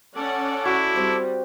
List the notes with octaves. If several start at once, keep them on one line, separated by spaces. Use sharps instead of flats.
C#4 A4 D5 F#5 D6
E4 F#4
G3 C4 G4